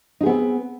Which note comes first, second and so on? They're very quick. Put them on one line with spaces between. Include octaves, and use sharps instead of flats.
D#4 G#4 B3 C4